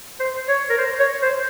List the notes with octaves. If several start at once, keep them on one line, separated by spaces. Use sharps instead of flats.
C5
C#5
A#4
C5
C#5
C5